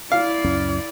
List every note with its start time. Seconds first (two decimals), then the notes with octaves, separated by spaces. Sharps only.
0.12 E4 D5 F5
0.44 C#2 F#2 C#4